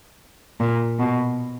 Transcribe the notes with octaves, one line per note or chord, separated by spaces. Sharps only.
A#2
B2